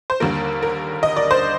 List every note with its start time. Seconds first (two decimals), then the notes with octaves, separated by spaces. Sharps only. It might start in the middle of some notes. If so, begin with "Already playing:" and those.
0.10 C5
0.20 D#2 D3 G3 A#3 A#4
0.63 A#4
1.03 D#5
1.17 D5
1.31 C5